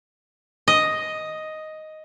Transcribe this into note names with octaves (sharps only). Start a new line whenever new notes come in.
D#5